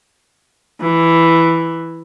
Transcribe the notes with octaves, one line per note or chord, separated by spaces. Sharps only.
E3